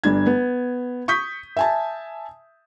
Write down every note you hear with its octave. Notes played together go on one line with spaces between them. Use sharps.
G1 D4 G#6
B3
C#6 D#6 G6 B6
E5 G#5 A5